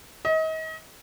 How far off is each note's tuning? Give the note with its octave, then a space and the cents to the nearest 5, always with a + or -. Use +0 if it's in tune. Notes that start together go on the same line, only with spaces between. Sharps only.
D#5 +35